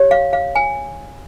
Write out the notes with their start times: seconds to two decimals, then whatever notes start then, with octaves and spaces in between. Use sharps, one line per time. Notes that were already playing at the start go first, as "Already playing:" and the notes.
Already playing: G4 C#5
0.11 F5
0.33 F5
0.55 G#5